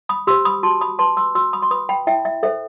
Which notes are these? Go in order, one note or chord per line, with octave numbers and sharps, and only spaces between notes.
B5 D#6
G4 C5 C6 E6
B5 D#6
F#4 A5 C6
B5 D#6
B4 A5 C6
C6 E6
F#4 C6 E6
B5 D#6
C6
B4 B5 D#6
G5 B5
E4 E5 G5
E5
A4 C5 E5